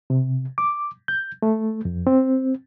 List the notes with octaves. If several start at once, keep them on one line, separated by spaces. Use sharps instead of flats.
C3
D6
G6
A3
F2
C4